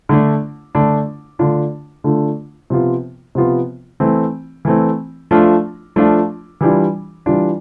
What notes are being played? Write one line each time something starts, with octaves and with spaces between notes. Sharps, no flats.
D3 A3 D4
D3 A3 D4
D3 A3 D4 F4
D3 A3 D4 F4
C3 F3 B3 F4
C3 F3 B3 F4
E3 A3 C4
E3 A3 C4
F3 A3 D4 F4
F3 A3 D4 F4
E3 G3 D4 F4
E3 G3 D4 F4